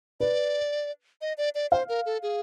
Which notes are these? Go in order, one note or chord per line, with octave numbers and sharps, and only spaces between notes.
B4 D5
D#5
D5
D5
C5 F5
A#4
A4
G#4